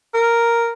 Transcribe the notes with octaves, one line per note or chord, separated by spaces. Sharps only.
A#4